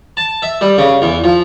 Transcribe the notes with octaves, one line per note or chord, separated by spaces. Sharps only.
A5
E5
G3
C#3
E2
F3